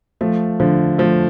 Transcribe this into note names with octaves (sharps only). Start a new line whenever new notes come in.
F3 A3
D3 F3
F3 A3